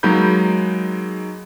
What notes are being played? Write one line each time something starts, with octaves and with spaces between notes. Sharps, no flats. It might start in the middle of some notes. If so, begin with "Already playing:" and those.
F#3 G#3 A#3 D#4 B5 G6